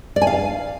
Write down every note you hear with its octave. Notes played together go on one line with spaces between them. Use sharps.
D5
G#5
F5